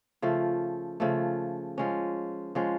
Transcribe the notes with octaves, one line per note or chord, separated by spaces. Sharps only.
C#3 F3 A3
C#3 F3 A3
F3 G#3 C#4
F3 G#3 C#4